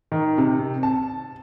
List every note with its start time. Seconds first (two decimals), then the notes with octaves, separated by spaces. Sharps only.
0.12 D#3
0.38 C3
0.83 A5